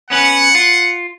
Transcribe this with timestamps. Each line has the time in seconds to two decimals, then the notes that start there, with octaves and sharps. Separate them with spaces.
0.10 B3 C#4 B4 F#5
0.55 F4